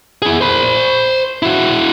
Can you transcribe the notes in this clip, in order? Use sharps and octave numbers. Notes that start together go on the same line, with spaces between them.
E4 G#4
C5 B5
E4 F#4